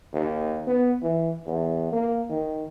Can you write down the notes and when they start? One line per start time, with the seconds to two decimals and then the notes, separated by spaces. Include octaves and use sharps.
0.13 D#2
0.67 B3
1.03 E3
1.46 E2
1.92 A#3
2.30 D#3